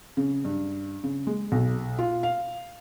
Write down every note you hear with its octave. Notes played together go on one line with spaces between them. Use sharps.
C#3
G2
C#3
G#3
B1
F4
F5